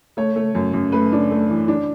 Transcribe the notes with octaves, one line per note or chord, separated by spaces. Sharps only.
A3 C#5
A3
F#2
F#2
A3 B4
D4
A3
E3
D4